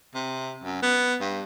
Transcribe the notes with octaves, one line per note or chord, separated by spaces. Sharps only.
C3
F#2
B3
G2